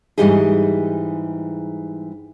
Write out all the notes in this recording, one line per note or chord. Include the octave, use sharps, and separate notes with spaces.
G#2 E3 G3 D#4 G4 G#4